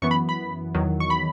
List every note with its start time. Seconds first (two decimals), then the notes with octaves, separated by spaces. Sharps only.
0.02 F#2 E3 B3 C#6
0.11 B5
0.29 B5
0.74 E2 D#3 F#3
1.00 C#6
1.10 B5